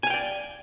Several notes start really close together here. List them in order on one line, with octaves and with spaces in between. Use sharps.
G#5 F5 G5 D5